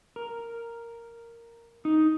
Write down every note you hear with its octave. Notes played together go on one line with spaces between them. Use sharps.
A#4
D#4